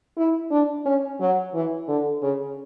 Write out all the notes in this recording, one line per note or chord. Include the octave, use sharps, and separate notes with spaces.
E4
D4
C#4
F#3
E3
D3
C#3